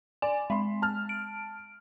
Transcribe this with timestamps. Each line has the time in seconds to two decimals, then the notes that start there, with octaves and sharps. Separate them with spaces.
0.22 D5 G#5
0.50 G#3 B5 C6
0.82 A5 F6
1.09 D7